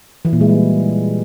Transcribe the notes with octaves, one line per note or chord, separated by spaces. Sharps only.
E3
A#2
G#3
G3